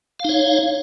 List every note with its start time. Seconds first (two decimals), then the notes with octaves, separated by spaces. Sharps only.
0.20 F5
0.24 D#4
0.29 C#5